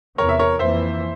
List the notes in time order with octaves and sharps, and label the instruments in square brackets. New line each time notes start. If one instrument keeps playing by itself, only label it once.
[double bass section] E2 C3 E3 [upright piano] A#4 C#5
[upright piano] E5
A#4 C#5
[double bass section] F2 E3 A#3 [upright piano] C5 E5